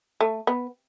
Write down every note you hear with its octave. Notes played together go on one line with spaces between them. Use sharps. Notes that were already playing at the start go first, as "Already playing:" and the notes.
A3
B3